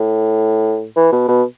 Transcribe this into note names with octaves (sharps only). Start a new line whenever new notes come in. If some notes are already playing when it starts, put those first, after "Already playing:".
Already playing: A2
E3
B2
B2